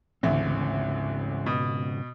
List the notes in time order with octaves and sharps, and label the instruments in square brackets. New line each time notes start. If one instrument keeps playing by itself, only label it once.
[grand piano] A1 D2 [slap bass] G#2 C#3 C4
[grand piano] B2